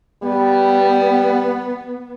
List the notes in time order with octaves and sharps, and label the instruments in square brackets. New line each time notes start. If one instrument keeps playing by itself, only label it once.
[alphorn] G3 [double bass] B3